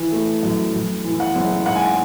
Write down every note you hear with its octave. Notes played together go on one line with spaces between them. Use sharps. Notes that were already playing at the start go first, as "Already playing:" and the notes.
Already playing: E3
A3
F#2
F#2
E3
F#5
F#1
G#2 F#5
G#5
F#5